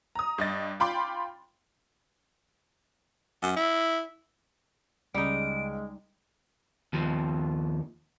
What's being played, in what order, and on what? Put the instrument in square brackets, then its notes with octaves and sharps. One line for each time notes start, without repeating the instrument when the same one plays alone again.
[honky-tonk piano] A#5 D#6
G2 D#5 A6
F4 G5 B5 C6 D6
[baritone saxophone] F#2
E4
[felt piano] C#2 C#3 [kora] G3 D#4 [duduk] G#3 [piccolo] D7
[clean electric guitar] D#2 F3